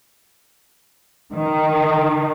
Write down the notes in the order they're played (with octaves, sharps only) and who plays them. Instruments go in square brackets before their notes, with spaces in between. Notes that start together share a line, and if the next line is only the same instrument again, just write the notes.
[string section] D#3